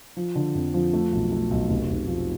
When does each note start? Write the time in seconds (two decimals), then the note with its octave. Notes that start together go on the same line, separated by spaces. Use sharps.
0.17 F3
0.35 D3
0.55 F2
0.74 F3
0.93 A3
1.13 B1
1.32 A3
1.51 B1
1.69 F1
1.89 F1
2.07 F3